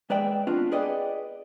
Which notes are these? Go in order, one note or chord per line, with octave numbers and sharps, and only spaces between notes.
G#3 B4 D5 E5 G5
B3 C4 D4 F4 F#4 B4
G#4 B4 D5 D#5 F#5 G5